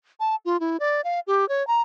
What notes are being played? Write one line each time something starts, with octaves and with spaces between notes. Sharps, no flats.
A5
F4
E4
D5
F5
G4
C#5
A#5